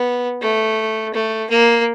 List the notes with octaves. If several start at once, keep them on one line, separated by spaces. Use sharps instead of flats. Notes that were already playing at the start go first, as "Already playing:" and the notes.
Already playing: B3
A3
A3
A#3